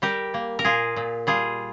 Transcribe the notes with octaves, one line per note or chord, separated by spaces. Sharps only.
G3 G4 A#4
A#3
A#4
A#2 F4 G#4
A#2
G3 F4 G#4